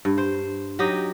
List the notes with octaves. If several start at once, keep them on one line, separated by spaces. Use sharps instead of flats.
G2
C5
F#3 D#4 G4 D#5